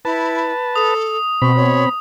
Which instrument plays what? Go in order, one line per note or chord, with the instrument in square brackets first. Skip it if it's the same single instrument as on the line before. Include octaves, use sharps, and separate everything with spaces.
[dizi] E4 [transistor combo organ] B4 A5
[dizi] A4 [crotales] D#6
[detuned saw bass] B2 [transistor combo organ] C4 B5 [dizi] C#6
[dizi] C#5